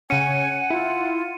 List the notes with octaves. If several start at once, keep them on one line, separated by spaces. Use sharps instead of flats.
C#3 C#4 F#5 G#5 C#7 D#7
E4 F4